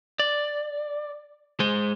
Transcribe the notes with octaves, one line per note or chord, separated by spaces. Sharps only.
D5
G#3 C5